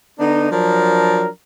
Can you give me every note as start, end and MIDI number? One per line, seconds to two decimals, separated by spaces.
0.19 0.48 50
0.19 0.48 59
0.19 0.48 62
0.19 0.48 63
0.52 1.28 53
0.52 1.28 54
0.52 1.28 62
0.52 1.28 70